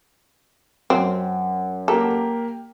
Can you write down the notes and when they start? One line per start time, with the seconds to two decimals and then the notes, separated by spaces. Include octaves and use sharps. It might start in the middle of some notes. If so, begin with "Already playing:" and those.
0.90 F#2 C4
1.88 A#3 G4 A4 A#4